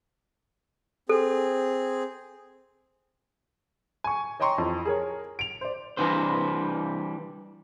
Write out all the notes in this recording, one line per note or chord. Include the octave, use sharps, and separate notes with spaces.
C4 G#4 A4
G#5 C#6
C#5 D#5 G5 A#5 C6 C#6
F2 E3
G#4 A#4 C#5
D7 F7
C5 D5
E3 G3 D4 B4 C5